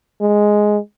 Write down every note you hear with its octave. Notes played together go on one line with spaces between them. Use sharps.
G#3